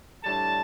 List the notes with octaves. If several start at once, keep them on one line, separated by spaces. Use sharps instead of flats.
A2 G3 D4 A5